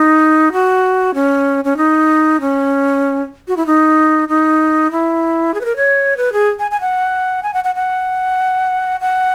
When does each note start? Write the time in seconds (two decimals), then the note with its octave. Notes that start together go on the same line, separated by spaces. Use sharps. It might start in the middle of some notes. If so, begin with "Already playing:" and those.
Already playing: D#4
0.53 F#4
1.14 C#4
1.65 C#4
1.77 D#4
2.41 C#4
3.48 F#4
3.57 E4
3.67 D#4
4.29 D#4
4.92 E4
5.54 G#4
5.61 B4
5.65 A#4
5.76 C#5
6.17 B4
6.33 G#4
6.59 G#5
6.71 G#5
6.81 F#5
7.43 G#5
7.54 F#5
7.64 F#5
7.75 F#5
9.01 F#5